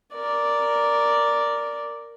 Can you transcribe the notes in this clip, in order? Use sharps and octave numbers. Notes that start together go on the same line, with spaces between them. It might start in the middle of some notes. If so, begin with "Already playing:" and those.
A#4 D5